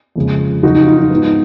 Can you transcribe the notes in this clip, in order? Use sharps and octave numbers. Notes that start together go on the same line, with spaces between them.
F2 C#3 G#3
F2 C#3 F#3 D#4 F#4
D#4
F4
D#4
G#2 F3 B3